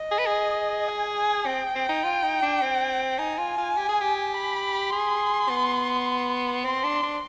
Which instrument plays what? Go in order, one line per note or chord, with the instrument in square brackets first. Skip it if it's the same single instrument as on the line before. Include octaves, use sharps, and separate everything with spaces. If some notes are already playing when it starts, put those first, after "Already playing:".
Already playing: [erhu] D#5
[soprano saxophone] G#4
B4
G#4
[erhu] G#5
[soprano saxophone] C4 [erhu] G5
[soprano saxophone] C4
D#4
F4
D#4
D4
C4
[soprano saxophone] D#4 [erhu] G#5
[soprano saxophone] F4
F4
G4
G#4
G4
[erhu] B5
[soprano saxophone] G#4 [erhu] C6
[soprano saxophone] B3
[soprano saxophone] C4 [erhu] C6
[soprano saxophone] D4
D4